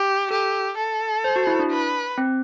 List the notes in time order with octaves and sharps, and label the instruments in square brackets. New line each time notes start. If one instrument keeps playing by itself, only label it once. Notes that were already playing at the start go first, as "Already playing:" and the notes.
Already playing: [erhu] G4
[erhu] G4 [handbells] A4
[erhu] A4
[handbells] C5
F#4
E4
D4
[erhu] B4
[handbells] C4